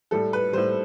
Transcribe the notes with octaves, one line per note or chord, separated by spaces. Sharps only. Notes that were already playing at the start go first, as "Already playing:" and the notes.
A2 G3 A4
B4
A2 G3 C5